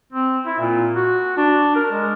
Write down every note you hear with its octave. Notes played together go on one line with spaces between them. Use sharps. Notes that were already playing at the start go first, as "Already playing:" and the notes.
C4
E4
A#2
F#4
D4
A#4
G#3